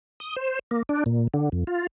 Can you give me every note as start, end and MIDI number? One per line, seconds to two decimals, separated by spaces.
0.20 0.36 87
0.36 0.59 72
0.71 0.83 58
0.89 1.04 62
1.06 1.28 46
1.34 1.49 50
1.52 1.64 41
1.67 1.87 65